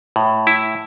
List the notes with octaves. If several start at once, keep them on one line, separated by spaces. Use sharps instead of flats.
A2
E4